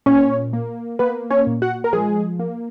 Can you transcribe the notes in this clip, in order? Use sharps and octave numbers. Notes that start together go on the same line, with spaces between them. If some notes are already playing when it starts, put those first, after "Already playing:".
A#2 C#4 C#5
A#3
A#3 B3 B4
C#4 C#5
A#2
F#4 F#5
A#4
F3 G#3 G#4
A#3